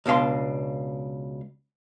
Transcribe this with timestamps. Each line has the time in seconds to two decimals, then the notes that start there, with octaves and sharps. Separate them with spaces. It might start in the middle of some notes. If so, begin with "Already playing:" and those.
0.06 C#2 B2 D4 F5 C6